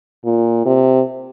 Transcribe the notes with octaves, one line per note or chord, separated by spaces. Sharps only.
A#2
C3